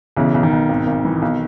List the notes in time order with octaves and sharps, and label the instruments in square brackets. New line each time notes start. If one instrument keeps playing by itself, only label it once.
[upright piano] B1 [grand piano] C#3 E3
[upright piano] B1
[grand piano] D#3
[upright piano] B1
G#1
G#1
E3
B1